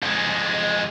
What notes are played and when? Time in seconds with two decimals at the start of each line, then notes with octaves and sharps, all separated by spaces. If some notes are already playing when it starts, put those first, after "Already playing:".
0.03 F2 G#3